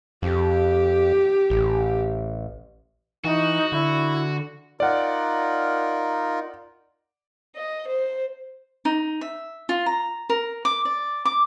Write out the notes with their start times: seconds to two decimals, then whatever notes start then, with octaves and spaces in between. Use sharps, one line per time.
0.22 F2 G4
1.50 A1
3.24 E3 D#4 F#4
3.72 D3 E4
4.80 D#4 F4 A#4 D5 F#5
7.56 D#5
7.88 C5
8.85 D#4
9.21 E5
9.69 F4
9.86 A#5
10.30 A#4
10.65 D6
10.85 D5
11.25 D6